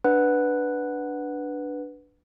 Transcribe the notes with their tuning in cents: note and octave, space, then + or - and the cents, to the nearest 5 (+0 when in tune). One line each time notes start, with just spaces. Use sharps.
D4 +0 B4 +0 F#5 +0